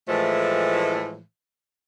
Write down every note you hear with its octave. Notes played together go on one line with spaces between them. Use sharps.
A2 E3 F3 G#3 A3